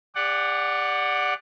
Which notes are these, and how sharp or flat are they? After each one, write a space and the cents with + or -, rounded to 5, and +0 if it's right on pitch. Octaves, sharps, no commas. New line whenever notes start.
G4 +45 D5 +0 F#5 +0